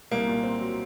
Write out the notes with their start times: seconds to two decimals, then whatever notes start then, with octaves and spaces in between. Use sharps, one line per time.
0.11 C2 A#3
0.27 A#2
0.44 C4
0.61 F#3